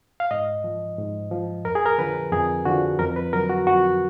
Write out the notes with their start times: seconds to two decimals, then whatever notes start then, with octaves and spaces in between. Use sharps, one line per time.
0.20 F5
0.31 G#2 D#5
0.64 F3
0.98 G#2
1.31 F3
1.65 F2 A#4
1.75 G#4
1.86 A#4
1.98 D3 F3 B4
2.32 F2 G#4
2.65 D3 F3 F#4
2.99 F2 A#4
3.16 B4
3.33 D3 F#3 A#4
3.50 F#4
3.67 F2 F#4